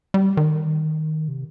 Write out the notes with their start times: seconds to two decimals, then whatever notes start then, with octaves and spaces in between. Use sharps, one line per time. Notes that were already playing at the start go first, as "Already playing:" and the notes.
0.14 G3
0.37 D#3
1.28 C3